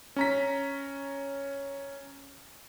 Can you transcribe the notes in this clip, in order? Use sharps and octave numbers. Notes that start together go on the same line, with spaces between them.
C#4 A#5 B6